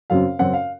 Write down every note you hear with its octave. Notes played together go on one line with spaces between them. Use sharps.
F#2 C#3 F#3 C4 F5
F#2 C#3 F#3 C4 F#5
F5